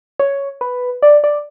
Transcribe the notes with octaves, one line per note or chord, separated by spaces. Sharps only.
C#5
B4
D5
D5